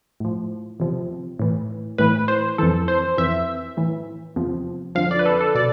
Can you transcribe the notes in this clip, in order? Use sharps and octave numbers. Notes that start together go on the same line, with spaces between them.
A2 F3
E2 C3 F3
A2 E3
A2 E3 B4
C5
F2 E3 A4
C5
F2 E3 E5
A2 E3
E2 C3 F3
F2 D3 F3 F5
D5
B4
A4
A4
B2 D5